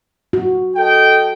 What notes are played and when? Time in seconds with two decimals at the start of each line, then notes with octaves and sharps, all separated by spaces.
0.33 F#4
0.76 A4 D#5 G5